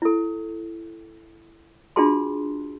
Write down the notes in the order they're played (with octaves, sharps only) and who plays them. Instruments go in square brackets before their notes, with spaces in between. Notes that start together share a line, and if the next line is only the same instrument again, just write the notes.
[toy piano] E4 A4
D4 F4 F#4 G#4 A5 C6